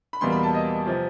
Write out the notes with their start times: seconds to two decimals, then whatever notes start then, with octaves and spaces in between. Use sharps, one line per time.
0.13 B5
0.21 E2 B2 G3 A#3 C6
0.32 B5
0.43 A5
0.55 D#5
0.87 C3 F3